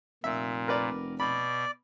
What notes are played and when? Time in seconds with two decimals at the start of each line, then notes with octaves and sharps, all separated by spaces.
0.24 F1 A#2 E5
0.68 A#4 B4 D5
1.20 B2 D5 B5